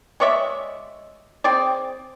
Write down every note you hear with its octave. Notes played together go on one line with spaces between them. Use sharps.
G#3 C#5 D5 E5
C4 G#4 D5